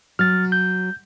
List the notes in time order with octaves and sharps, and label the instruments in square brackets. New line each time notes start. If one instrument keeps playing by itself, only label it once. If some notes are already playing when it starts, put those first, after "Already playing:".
[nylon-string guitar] F#3 [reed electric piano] F6 A6
[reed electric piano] G6